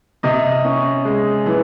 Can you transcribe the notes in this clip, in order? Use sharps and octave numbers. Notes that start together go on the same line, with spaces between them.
C3 D#5
C#4
G#3
E3